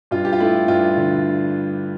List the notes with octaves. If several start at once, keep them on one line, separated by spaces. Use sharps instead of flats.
G2 F4
G4
F4
A3 E4
G2 F4
D3